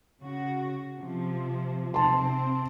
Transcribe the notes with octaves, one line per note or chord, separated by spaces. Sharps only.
C#3 F#4
C3 F3
C3 C4 A5 C6